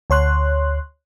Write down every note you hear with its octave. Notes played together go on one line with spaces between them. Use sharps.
D2 C#5 C6 F#6